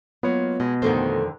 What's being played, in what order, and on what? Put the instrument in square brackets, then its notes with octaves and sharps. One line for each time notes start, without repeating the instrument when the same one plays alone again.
[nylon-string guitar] F#3 G#3 A#3 [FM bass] B3 [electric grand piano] F4 B4 C#5
[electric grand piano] B2 [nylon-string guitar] G#3
[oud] F2 D3 D#3 [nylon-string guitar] A3 C5